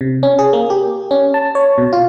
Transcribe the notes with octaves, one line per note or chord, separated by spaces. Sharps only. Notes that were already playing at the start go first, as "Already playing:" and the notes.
C3
C#4
G#4
A#3
G4
C#4
A5
C#5
B2
F4